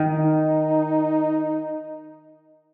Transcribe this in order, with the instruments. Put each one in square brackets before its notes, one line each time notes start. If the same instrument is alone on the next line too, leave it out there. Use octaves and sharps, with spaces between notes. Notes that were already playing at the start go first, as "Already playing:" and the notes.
Already playing: [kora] D#3 [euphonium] D#4